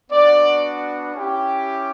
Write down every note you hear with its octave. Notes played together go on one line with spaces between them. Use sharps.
B3 D4 F#4 D5
C#4 E4 G4